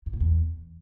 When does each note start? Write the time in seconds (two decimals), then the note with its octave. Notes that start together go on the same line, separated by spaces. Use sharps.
0.06 F#2
0.13 A#2
0.20 E2